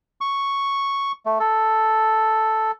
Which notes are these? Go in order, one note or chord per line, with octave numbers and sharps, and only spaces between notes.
C#6
A3
A4